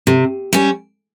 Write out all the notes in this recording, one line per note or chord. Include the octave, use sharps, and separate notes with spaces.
C3
G3 C#4